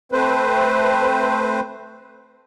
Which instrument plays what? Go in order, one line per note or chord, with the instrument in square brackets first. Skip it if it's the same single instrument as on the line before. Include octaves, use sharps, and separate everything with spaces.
[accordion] A3 C4 B4 C5